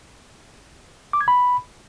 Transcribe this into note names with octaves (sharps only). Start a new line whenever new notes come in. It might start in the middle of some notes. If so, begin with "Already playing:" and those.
D6
G#6
B5